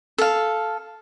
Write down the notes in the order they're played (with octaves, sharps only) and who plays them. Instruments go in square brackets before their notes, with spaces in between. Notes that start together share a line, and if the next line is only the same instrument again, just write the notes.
[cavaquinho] A4 F5